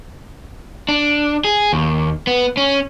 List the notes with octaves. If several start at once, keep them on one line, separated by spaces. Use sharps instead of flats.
D4
G#4
D#2
B3
C#4